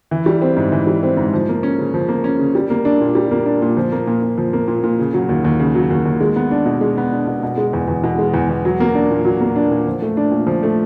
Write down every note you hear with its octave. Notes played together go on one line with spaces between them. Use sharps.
E3
G3
C4
G#2
E3
G3
C4
G#2
F3
A#3
C#4
C#3
F3
A#3
C#4
C#3
G3
A#3
D4
A#2
G3
A#3
D4
A#2
F3
A#3
A#2
A#2
F3
A#3
A#2
A#2
C#3
F#3
D#2
D#2
C#3
F#3
D#2
D#2
G#3
B3
D4
B2
G#3
B3
D4
B2
B2
G#3
E2
E2
B2
G#3
E2
E2
F#3
A#3
D4
A#2
F#3
A#3
D4
A#2
F3
A3
D4
A#2
F3
A3